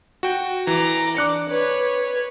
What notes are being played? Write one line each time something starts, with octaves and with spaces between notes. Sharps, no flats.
F#4 G5
E3 A#5 D6
D4 D6 F#6 C#7
B4 C#5